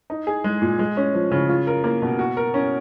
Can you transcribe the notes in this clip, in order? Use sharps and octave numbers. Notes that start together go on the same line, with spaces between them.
D#4
G#4
G#3
A#2
G#3
C#4
F3
C#3
F4
A#4
A#3
B2
F#4
A#4
C#4